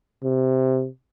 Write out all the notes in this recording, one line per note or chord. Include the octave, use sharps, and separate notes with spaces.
C3